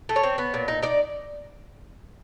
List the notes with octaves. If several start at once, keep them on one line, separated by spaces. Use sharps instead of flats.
A3
C#5
C4
B3
A#2
D#4
D#4 D5